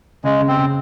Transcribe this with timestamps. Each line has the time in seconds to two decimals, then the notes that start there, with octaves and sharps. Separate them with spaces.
0.24 C#3 G#3
0.40 C#3
0.48 C4
0.57 C#3